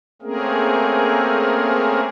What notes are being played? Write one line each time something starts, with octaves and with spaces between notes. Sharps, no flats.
A3 A#3 C4 C#4 G#4 A#4